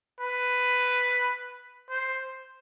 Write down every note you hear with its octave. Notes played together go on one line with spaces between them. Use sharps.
B4
C5